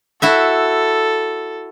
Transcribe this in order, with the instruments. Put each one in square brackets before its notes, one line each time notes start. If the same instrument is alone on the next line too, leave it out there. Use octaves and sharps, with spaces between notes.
[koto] E4 F#4 E5 [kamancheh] A4